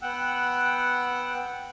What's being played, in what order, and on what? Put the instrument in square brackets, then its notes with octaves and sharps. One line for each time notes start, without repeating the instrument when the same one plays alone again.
[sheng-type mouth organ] B3 F#5 G5 E6 F#6